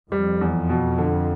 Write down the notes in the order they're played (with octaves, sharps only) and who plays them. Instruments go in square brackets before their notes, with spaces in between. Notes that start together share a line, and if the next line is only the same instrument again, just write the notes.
[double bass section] F2 [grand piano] G3
[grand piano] E2
B2
D3